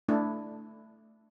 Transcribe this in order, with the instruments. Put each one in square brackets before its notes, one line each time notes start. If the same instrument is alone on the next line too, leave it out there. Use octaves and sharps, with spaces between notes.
[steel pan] A3 D4 E4